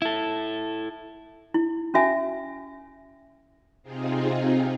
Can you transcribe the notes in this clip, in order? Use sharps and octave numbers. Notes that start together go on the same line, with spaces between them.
E4 A4
E4
C#4 F#4 E5 G#5
C3 C4 D#4 F4 G#4